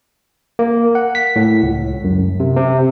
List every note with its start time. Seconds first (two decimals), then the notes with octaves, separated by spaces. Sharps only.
0.59 A#3
0.95 F#5
1.15 B6
1.36 A2
1.63 C#2
2.04 F#2
2.40 C3
2.57 C3